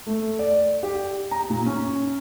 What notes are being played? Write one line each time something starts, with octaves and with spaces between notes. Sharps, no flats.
A3
D5
G4
A#5
A#2
C#4